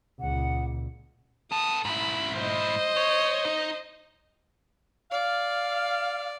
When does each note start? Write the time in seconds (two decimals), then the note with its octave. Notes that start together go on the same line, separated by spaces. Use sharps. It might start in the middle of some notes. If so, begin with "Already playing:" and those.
0.20 C#2 A#2 F#5
1.52 B3 A4 D#6
1.85 G#2 E4 B5
2.37 C5 D#5
2.97 C#5
3.45 D#4
5.11 D5 F5